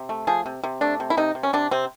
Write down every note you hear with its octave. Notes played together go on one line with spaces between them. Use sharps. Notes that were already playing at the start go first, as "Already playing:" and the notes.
Already playing: C3
A3
F3 G#4
C3
C3
A3 D4
C3
E4
C3 D#4
C3
C#4
C3 D4
C3 C4